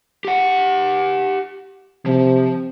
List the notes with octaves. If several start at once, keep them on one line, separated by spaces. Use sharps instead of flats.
G4 F#5
C3 F3